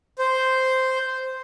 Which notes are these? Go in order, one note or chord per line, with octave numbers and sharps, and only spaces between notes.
C5